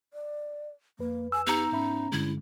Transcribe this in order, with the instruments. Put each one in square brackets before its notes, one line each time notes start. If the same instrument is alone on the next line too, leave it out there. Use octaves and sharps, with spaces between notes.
[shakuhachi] D5
[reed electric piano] F2 B4 [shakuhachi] A#3
[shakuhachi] G#5 [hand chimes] E6
[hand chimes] B3 A#5 [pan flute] D#4 [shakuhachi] G4
[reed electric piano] G#2 E5 B5 [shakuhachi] C#4
[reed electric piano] G2 D3 G#3 [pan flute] E4